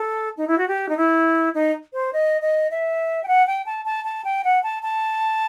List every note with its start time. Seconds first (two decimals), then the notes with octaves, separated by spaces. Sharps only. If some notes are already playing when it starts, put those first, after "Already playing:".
Already playing: A4
0.37 D#4
0.48 E4
0.58 F#4
0.68 G4
0.89 D#4
0.97 E4
1.54 D#4
1.93 C5
2.13 D#5
2.42 D#5
2.71 E5
3.24 G5
3.28 F#5
3.47 G5
3.66 A5
3.85 A5
4.05 A5
4.25 G5
4.44 F#5
4.63 A5
4.83 A5